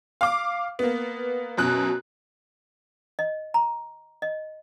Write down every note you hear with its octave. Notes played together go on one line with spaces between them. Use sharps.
F5 D6
A#3 B3
F#2 B2 F#6
D#5
A#5
D#5